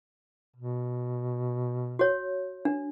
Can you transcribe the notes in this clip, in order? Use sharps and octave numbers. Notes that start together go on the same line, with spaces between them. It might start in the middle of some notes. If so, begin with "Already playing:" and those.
B2
F#4 C#5
D4